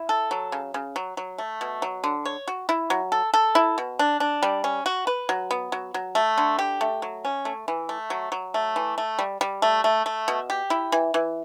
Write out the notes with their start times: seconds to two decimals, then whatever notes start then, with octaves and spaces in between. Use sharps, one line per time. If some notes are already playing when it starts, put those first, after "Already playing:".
Already playing: E4
0.09 A4
0.31 F#3
0.52 C#3
0.74 C#3
0.96 F#3
1.17 F#3
1.38 A3
1.61 B2
1.82 F#3
2.04 D3
2.25 C#5
2.48 F#4
2.69 E4
2.90 F#3
3.12 A4
3.34 A4
3.55 E4
3.78 B2
3.99 D4
4.20 D4
4.43 G3
4.64 C#4
4.86 F#4
5.07 B4
5.29 F#3
5.51 B3
5.72 F#3
5.94 F#3
6.15 A3
6.38 D3
6.59 G4
6.81 A3
7.02 F#3
7.25 C#4
7.45 A3
7.68 E3
7.89 A3
8.10 F#3
8.32 F#3
8.54 A3
8.76 E3
8.98 A3
9.19 G3
9.41 G3
9.62 A3
9.84 A3
10.06 A3
10.28 B2
10.50 G4
10.70 E4
10.92 E3
11.14 E3